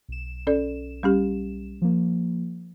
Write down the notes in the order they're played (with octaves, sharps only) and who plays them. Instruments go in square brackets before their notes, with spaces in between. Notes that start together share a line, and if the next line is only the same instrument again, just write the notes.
[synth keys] B1 E7
[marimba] C#4 A4 D5
G3 C#4 G4
[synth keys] F3 A#3